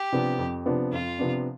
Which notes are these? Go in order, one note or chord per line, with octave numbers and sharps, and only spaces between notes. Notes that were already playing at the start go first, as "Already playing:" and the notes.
Already playing: G4
C3 F3 B3 D4
F2
C3 F3 B3 D4
F2 F4
C3 F3 B3 D4